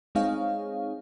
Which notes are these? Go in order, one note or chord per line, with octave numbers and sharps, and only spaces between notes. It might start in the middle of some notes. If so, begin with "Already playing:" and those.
G#3 C4 D#4 G#4 C#5 F5